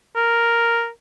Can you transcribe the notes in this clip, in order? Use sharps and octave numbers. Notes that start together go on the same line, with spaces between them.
A#4